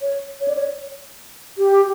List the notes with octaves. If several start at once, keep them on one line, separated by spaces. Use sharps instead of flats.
C#5
C#5
D5
C#5
G4